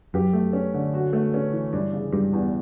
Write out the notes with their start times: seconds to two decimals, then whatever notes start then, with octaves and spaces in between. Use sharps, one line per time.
0.14 F#2 G4
0.33 A3
0.53 C#4
0.74 D3
0.94 F#4
1.13 A3
1.34 C#4
1.53 E3
1.72 G2 D4
1.93 C#3
2.13 G2 G3
2.33 E2